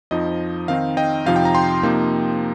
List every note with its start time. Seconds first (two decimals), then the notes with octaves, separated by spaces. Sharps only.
0.11 F2 F3 D#4 D#5
0.68 D#3 C4 D#4 F5
0.97 D#5 G5
1.26 F2 C3 F3 D#4 F5
1.36 G5
1.45 A#5
1.55 G5 C6
1.83 C3 F3 A#3 D#4